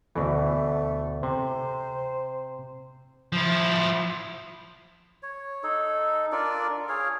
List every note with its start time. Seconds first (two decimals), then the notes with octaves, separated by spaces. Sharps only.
0.16 D2 B2 E3 A3
1.23 C3 C5
3.33 F3 E4
5.23 C#5
5.63 D#4 A4
6.32 D4 F4 A#4 D5
6.89 G#4 C#5 F5